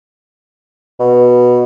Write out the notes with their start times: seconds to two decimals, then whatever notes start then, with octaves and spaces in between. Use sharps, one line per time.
1.00 B2